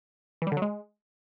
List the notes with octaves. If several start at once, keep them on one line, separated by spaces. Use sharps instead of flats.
E3
G3
D3
F#3
G#3